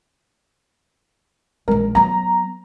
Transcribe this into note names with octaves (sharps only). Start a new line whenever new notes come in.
A#1 G#3 A#4
F#3 B3 A#5